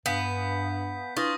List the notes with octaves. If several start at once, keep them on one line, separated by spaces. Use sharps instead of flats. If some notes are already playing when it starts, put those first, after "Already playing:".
G2 B3 F5 G#5 D#6 G6 B6
D4 E4 F4 B4 C#6 D#6 A#6